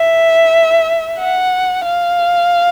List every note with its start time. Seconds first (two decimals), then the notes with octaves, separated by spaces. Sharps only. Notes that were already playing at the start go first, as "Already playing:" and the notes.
Already playing: E5
1.19 F#5
1.85 F5